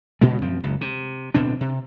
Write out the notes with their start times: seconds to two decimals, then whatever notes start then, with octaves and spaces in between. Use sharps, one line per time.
0.21 G2 A#2 C#3 G#3
0.42 F#2 F3 C4
0.63 F#1 C#2
0.81 C3
1.34 D1 B2 C4 D4
1.61 C3